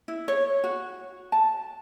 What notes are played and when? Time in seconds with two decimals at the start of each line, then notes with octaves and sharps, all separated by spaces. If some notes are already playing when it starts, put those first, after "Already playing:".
0.08 E4
0.28 C#5
0.64 F#4
1.32 A5